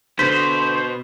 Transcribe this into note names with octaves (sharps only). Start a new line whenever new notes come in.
B2 D3 C5 B6